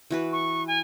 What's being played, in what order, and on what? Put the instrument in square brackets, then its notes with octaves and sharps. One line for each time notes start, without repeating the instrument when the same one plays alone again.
[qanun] E3 F#4 B4
[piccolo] C#6
G#5